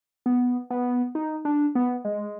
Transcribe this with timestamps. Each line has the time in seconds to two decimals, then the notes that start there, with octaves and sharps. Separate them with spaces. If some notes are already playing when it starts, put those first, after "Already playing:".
0.26 B3
0.70 B3
1.15 D#4
1.45 D4
1.75 B3
2.05 G#3